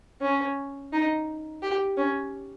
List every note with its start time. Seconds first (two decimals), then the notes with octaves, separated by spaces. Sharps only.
0.22 C#4
0.93 D#4
1.62 G4
1.97 C#4